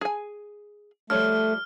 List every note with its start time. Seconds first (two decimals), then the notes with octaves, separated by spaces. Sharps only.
0.01 G#4 G#5
1.10 F3 G3 A3 C#5 F6